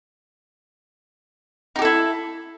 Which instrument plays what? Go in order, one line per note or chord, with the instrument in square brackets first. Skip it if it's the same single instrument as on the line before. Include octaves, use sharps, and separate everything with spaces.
[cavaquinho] D#4
G4
A4
E4